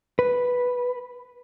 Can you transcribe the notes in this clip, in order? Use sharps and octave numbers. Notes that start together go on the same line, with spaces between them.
B4